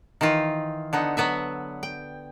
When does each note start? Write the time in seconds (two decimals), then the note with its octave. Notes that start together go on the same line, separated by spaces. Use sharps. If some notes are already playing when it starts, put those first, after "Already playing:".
0.21 D#3 E3 D#4 F4
0.93 D3 B3 D#4
1.17 F#3 B3 B4 E5
1.83 G5